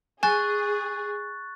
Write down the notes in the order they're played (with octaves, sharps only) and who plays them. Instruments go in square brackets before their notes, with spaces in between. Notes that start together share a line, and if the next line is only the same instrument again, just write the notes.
[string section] G#4 [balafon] G#5 [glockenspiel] C#6 F#6 A6